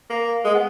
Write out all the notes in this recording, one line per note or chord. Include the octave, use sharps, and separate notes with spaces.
A#3
G#3
B3